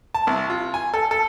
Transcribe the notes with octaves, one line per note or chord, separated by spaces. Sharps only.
A5
C2
F4
G#5
A4
A4